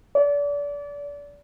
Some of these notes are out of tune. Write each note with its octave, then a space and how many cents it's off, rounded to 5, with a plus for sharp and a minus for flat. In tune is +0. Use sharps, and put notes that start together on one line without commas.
D5 -30